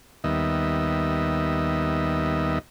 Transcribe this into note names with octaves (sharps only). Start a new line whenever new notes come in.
D#2 D#3 G3 B3 D#5 E5